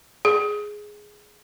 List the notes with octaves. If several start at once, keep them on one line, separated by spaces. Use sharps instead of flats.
G#4